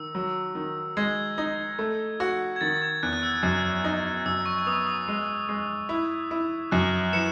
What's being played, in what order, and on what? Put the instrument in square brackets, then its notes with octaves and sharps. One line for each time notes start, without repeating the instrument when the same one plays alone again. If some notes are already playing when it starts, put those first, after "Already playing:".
Already playing: [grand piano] D#3 [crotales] E6
[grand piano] F#3
D#3
[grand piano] G#3 [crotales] G#6
[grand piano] D#4
A3
F#4
[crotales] G#6
[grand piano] D#3 [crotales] A6
[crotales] G#6
[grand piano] E2 [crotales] F#6
[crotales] F#6
E6
[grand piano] F#2 [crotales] F#6
[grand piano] D#4
[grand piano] F#2 [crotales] E6
[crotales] C#6
C#6
[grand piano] B3 [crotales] D#6
[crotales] D#6
[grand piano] G#3
G#3
E4
E4
[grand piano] F#2 [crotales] F#6
[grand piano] E3 [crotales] C#7 E7